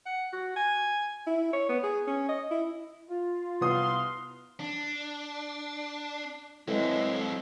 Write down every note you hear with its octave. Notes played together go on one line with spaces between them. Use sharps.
F#5
F#4
G#5
E4
C#5
B3
G#4
C#4
D#5
E4
F4
C2 B3 F5 C6 D#6
D4
A2 E3 F#3 G#3 C4